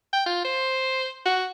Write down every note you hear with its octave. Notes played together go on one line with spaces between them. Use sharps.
G5
F4
C5
F#4